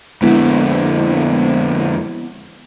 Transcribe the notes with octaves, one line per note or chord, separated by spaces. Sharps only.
F2 D3 G#3 B3 E4